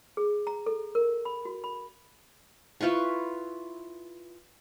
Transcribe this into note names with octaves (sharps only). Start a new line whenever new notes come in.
G#4
A#5
A4
A#4
B5
F#4
B5
E4 F4 B4 C#6